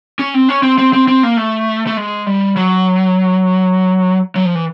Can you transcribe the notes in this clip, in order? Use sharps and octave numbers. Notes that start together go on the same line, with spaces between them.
C#4
C4
C#4
C4
C4
C4
C4
A#3
A3
A3
G#3
G3
F#3
F#3
F3
E3